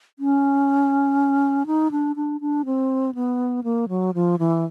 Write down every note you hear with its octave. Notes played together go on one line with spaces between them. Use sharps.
C#4
D#4
D4
D4
D4
C4
B3
A#3
F#3
F3
E3